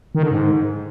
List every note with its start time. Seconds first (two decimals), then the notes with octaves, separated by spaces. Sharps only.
0.15 D#3
0.23 D3
0.31 G#2